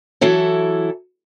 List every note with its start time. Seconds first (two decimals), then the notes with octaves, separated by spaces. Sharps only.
0.21 E3 F#3 E4 A4